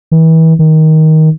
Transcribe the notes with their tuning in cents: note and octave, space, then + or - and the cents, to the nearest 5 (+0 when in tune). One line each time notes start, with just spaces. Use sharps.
E3 -35
D#3 +15